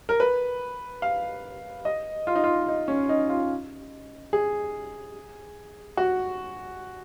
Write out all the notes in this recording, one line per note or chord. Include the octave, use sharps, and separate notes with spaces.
A#4
B4
F5
D#5
F4
D#4
F4
D#4
C#4
D#4
F4
G#4
F#4